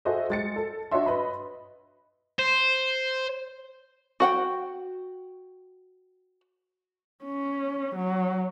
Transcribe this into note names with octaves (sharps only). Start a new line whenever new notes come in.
F#4 G#4 A4 C5 D#5 E5
G#3 A6 C#7
A4
D4 F#4 C#5 D#5 E5 C6
B4 D#5 B5
C5
F#4 F#5 G5
C#4
F#3